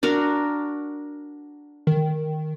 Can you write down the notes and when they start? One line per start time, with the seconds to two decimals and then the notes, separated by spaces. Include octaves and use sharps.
0.03 D4 F#4 A#4
1.87 D#3